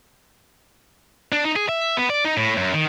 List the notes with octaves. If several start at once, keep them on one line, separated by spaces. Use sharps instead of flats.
D4
D#4
G#4
E5
B3
D5
D#4
A2
F#2
D#3